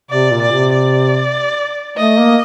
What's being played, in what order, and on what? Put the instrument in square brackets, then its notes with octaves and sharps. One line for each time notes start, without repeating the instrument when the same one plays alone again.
[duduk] C3 [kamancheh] D5
[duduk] A#2
[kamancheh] D5
[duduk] C3
[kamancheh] D5
[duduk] A3 [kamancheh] D#5
[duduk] A#3